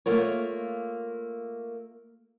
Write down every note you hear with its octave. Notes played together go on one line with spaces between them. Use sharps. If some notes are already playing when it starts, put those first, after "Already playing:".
A3 A#3 F4 A#4 C#5